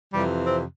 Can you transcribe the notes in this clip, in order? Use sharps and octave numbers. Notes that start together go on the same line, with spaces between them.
F2 C3 E3 G3
C4